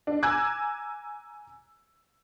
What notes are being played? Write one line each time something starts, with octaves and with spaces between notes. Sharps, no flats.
D4
G#5 A#5 D6 E6 F#6 G#6